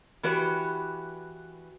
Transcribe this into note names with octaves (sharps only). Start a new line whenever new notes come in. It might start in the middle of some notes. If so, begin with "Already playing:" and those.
E3 F#4 G4 B4 D5